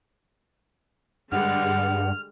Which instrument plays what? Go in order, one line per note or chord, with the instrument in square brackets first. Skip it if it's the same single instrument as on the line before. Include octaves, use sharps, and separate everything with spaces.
[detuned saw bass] G2 [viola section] D3 G3 G#3 [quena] F#5 [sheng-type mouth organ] F6